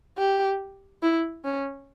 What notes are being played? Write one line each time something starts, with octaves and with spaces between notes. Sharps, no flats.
G4
E4
C#4